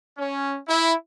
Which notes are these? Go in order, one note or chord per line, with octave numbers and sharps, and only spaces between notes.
C#4
E4